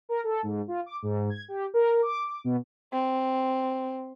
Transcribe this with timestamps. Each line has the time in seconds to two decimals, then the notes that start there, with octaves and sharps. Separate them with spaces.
0.09 A#4
0.24 A4
0.43 G#2
0.68 F4
0.86 D6
1.02 G#2
1.30 G#6
1.48 G4
1.74 A#4
2.02 D6
2.44 B2
2.93 C4